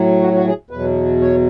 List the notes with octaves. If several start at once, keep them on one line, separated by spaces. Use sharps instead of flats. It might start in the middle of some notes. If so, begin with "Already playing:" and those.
Already playing: A2 F#3
F#4
F#4
G#4
E2 B2 F#3 B4
C#5